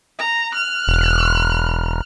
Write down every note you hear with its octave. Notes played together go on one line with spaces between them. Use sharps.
A#5
F6 F#6
E1